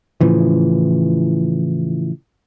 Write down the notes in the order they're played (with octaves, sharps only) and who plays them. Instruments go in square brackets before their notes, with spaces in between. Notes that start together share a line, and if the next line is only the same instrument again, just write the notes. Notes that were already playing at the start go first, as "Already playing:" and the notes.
[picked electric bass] A2 C#3 E3 F3